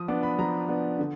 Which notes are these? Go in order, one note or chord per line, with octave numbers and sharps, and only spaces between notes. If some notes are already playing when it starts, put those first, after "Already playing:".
Already playing: F3 D#6
B3 D4 D6
B5
F3 A#5
B3 D4
D3